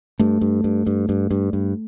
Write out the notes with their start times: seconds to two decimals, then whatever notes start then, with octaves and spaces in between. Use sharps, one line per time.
0.19 G2 A3
0.41 G2
0.64 G2
0.87 G2
1.09 G2
1.31 G2
1.53 G2